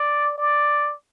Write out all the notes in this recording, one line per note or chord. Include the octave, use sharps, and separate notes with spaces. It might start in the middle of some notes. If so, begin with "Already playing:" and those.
Already playing: D5
D5